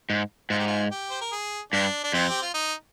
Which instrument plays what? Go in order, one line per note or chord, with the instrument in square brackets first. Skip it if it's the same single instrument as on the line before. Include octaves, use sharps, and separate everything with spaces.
[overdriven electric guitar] G#2
[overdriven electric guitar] G#2 [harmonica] F4
[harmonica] G4
F4
G4
C5
A#4
G#4
[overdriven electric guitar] G2 [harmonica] D4
[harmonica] D4
[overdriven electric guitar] F2 [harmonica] C4
[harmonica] G4
F4
D#4